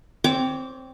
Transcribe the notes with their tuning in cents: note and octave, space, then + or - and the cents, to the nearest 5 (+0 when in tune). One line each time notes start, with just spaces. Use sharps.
C4 +0 C#5 +30 D6 -10